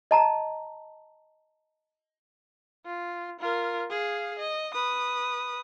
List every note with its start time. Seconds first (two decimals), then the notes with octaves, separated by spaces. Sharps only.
0.11 D#5 A5 A#5
2.86 F4
3.40 F4 A#4
3.89 G#4 F5
4.39 D#5
4.74 B4 D#6